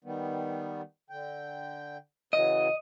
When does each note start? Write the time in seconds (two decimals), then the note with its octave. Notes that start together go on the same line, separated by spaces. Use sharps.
0.04 D#3 G3 B3
1.10 D3 G5
2.33 C#3 E3 F#3 D#5